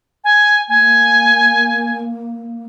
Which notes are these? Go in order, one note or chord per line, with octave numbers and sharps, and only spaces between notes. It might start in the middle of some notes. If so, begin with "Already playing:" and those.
G#5
A#3 G#5